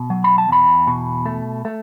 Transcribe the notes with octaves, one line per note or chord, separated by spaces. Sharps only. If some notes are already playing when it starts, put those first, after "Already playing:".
Already playing: B2
F#3
B5
A5
E2 B5
B2
A3
A3